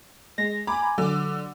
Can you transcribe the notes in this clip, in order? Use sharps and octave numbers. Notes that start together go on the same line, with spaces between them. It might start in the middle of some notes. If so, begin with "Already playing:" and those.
G#3 A#6
G#5 A#5 B5 D6
D3 F#3 D6